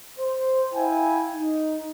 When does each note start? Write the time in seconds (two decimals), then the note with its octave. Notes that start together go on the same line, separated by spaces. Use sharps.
0.19 C5
0.73 E4 F5 G5 G#5
1.34 D#4